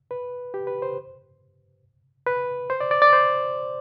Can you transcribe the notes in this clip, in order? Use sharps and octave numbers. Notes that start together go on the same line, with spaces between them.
B4
G4
B4
C5
B4
C5
D5
D5
D5
C5